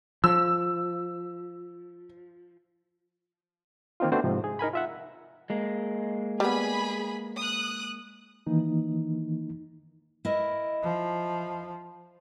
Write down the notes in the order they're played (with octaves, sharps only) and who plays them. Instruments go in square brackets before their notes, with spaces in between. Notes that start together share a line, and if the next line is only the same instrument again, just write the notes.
[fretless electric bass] F3 [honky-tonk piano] E6
[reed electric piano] D#3 A#3 C4 D#4 F4
A3 B3 C4 D4 F#4 C5
G#2 C3 F3
G#4
D#4 A#4 G#5 B5
F4 E5 F#5
[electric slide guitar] G#3 A#3
[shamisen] G3 B3 [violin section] G#4 B5
[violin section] D#6 F#6
[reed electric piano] D#3 E3 A#3 D#4
[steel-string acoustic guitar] E4 A#4 D#5
[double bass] F3